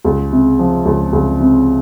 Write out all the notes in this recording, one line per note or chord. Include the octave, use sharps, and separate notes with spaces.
C#2
C3
F3
C#2
C#2
C3